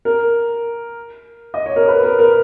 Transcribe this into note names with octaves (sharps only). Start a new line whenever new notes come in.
A#4
D#5
C#5
A#4
B4
A#4
A#4